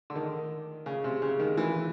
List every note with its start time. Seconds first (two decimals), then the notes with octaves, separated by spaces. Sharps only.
0.10 D3
0.15 D#3
0.86 C#3
1.04 C3
1.22 C#3
1.40 D#3
1.58 E3